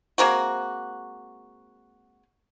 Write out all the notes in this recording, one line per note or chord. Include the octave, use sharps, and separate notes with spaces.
G#3 A#3 C4 F#4